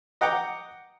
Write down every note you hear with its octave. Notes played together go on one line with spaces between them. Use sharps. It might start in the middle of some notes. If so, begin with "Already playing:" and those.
D#5 F#5 G5 A#5 D6